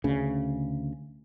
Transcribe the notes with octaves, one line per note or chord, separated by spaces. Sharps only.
D2 C#3